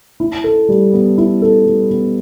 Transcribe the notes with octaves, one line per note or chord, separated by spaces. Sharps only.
E4
A4
G3
B3
E4
A4
G3
B3